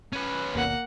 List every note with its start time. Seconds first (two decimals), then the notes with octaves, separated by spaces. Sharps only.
0.13 C#4 B4
0.54 G#1 D#2 B2 A#3 F#5